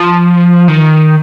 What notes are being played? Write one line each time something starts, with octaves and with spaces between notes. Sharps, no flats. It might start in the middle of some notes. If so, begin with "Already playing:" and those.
Already playing: F3
D#3